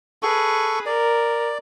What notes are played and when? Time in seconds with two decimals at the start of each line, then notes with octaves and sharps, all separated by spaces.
0.23 G#4 A4 B4 C#6
0.86 A#4 D5